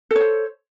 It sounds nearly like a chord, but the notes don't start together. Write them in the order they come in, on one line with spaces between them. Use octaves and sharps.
A4 C#5 C5